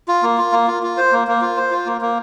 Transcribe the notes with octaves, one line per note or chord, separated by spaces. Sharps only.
F4
A#3
F4
A#3
F4
F4
C5
A#3
A#3
F4
C5
F4
A#3
A#3